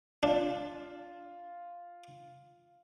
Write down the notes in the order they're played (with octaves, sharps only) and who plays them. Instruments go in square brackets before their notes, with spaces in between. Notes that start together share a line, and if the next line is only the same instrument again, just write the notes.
[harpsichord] D4 [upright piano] F4